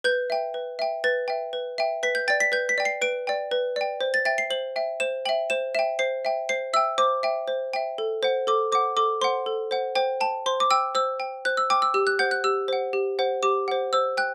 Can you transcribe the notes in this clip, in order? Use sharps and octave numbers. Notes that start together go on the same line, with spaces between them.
B4 G6
E5 G5
B4
E5 G5
B4 A6
E5 G5
B4
E5 G5
B4 B6
G6
D5 G5 A6
B6
B4 G6
B6
D5 G5
C7
B4 D7
D5 G5
B4
D5 G5
C5
A6
E5 G5 A6
C7
C5 F#7
E5 G5
C5 E7
E5 G5 F#7
C5 E7
E5 G5 E7
C5 C7
E5 G5
C5 C7
E5 G5 E6
C5 D6
E5 G5
C5
E5 G5
A4
C5 F#5
A4 D6
C5 F#5 D6
A4 D6
C5 F#5 C6
A4
C5 F#5
C5 G5
G5 A5
C5 C6
D6
G5 E6
C5 E6
G5
C5 F#6
E6
G5 D6
E6
G4 E6
F#6
C5 F#5 G6
F#6
G4 E6
C5 F#5
G4
C5 F#5
G4 D6
C5 F#5
C5 E6
G5 F#6